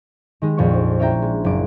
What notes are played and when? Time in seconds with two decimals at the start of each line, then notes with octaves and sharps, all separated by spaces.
0.42 D#3 G#3 G4
0.57 A#1 F2 A#2 B3 C#6
0.74 C5
0.99 C#4 D4 E4 E5 G5 A#5
1.22 G#3
1.44 F#1 D6